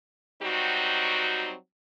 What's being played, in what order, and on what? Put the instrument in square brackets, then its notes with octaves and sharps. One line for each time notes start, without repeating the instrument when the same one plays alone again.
[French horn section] F#3 G3 C4 D#4 F#4